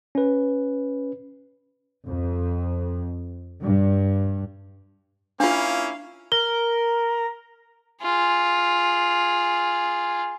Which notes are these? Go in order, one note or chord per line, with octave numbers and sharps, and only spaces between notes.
C#4 B4
F2
G2
A#3 C#4 D4 E4 F4 F5
A#4 G7
F4 G#4